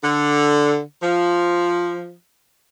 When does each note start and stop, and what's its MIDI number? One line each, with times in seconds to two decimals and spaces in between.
0.03 0.81 50
1.03 2.14 53